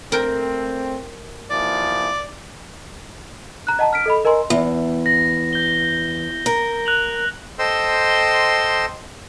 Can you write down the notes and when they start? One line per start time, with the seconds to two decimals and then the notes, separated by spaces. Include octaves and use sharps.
0.12 A3 C4 A#4 G5
1.51 D#2 E3 F3 D5
3.67 A#5 F#6
3.79 D#5 F#5 A5 A#5
3.93 F6 B6 D7
4.06 A4 D#5 B5
4.25 A#4 D#5 G#5 A#5 C6
4.50 E2
5.06 A#6
5.53 G6 G7
6.46 A#4
6.86 F#6 F7 F#7
7.59 A4 C5 D#5 G5 C6 E6